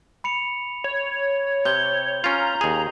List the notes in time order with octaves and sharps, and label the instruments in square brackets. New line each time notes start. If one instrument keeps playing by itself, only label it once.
[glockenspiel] B5 C#7 F7
[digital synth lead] C#5
[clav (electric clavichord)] C3 [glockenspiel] G6 G7
[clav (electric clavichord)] C#4 F4 [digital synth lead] A#5
[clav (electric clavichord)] D#2 G#4